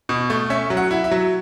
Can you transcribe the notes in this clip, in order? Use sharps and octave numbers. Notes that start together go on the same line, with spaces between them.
B2
A3
C#4 E5
F#3
F#5
E4
E5
F#3